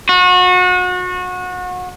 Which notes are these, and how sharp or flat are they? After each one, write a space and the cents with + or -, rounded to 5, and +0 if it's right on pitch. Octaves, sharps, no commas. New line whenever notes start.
F#4 -30